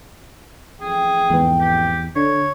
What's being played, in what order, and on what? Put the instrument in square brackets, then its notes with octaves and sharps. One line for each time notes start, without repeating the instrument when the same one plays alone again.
[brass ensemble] A1 F2 G5 [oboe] G#4
[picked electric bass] E2 [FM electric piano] G#2 B3
[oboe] G4
[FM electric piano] D3 [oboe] C#5